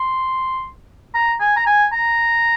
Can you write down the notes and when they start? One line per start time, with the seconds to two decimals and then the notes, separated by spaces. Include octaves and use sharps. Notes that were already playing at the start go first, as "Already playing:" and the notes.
Already playing: C6
1.15 A#5
1.40 G#5
1.56 A#5
1.67 G#5
1.93 A#5